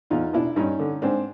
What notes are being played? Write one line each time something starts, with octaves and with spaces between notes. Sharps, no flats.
E2 D#4 F4
B2 D4 E4
G2 C#4 D#4
D3
G#2 C4 D4